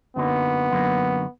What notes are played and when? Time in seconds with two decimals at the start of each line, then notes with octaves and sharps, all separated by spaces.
0.16 F#2 D3 F#3 A#3 B3 D#4
0.71 F#2 D3 F#3 A#3 D#4